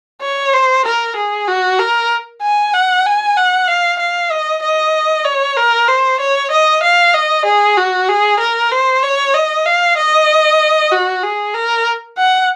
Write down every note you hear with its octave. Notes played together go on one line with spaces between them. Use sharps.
C#5
C5
A#4
G#4
F#4
A#4
G#5
F#5
G#5
F#5
F5
F5
D#5
D#5
C#5
A#4
C5
C#5
D#5
F5
D#5
G#4
F#4
G#4
A#4
C5
C#5
D#5
F5
D#5
F#4
G#4
A#4
F#5